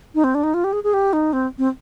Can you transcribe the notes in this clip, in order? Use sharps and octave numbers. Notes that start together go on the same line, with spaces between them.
D#4
C4
D4
D#4
F4
G4
G#4
G#4
G4
D#4
C4
C4